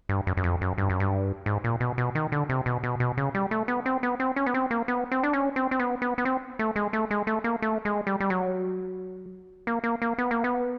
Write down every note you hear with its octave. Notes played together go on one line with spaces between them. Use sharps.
G2
F#2
F#2
F2
F#2
G2
F#2
G2
G#2
A#2
B2
B2
D#3
D3
C3
B2
B2
B2
C#3
G3
A3
B3
C4
B3
C4
C#4
B3
C4
A#3
B3
C4
D4
C#4
C4
C4
B3
B3
B3
C4
A3
G#3
A3
G#3
A3
A#3
A3
G#3
G3
G3
F#3
A#3
A#3
A#3
B3
A#3
B3